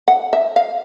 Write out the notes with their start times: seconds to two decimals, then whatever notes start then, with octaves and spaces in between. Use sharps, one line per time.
0.08 F#5
0.33 E5
0.56 F5